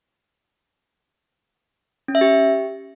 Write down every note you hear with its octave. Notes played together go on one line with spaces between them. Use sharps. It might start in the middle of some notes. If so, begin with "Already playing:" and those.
C#4
E5
G4